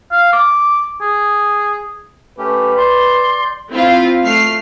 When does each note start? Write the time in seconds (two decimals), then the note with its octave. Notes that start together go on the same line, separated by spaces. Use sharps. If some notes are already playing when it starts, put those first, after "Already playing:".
0.12 F5
0.33 D6
1.02 G#4
2.38 A3 C#4 G4 B4
2.77 D5 C6 G6
3.71 C4 E4 F4 F5
4.23 A3 F6 C7